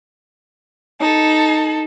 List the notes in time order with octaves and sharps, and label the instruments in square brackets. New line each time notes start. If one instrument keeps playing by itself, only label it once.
[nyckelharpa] D#4 [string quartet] A4